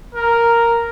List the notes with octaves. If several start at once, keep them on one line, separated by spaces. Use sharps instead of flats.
A#4